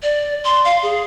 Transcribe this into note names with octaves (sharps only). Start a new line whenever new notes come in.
D5
C6
F5
G#4